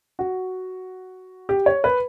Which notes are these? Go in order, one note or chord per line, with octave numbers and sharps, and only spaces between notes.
F#4
G4
C#5
B4